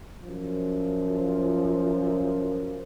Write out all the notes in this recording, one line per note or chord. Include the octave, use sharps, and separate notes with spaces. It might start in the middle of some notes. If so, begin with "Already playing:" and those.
F#2 F3